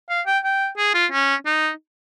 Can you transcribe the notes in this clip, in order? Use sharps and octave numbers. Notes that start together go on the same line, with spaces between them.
F5
G5
G5
G#4
F4
C#4
D#4